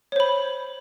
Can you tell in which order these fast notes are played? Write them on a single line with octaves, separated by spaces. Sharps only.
C#5 C5 B5